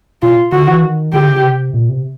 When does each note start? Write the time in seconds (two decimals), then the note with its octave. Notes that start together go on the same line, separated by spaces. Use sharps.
0.22 B2 F4
0.52 D3 F#4
0.68 E3
0.82 D#3
1.13 D3 G4
1.28 C#3
1.43 C3
1.74 A#2
1.89 C3